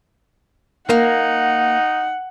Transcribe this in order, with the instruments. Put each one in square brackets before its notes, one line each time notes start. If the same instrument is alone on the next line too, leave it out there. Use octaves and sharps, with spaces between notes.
[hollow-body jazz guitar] A#3 [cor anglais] D#4 [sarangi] F#5